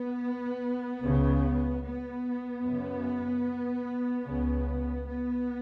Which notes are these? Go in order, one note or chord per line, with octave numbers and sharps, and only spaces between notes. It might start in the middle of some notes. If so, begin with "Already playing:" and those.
Already playing: B3
C#2
C#3
B3
F#2 C#3
C#2 C#3
B3